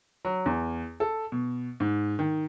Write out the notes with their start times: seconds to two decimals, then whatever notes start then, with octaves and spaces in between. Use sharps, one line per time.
0.25 F#3
0.46 E2
1.00 A4
1.32 B2
1.80 G#2
2.19 D#3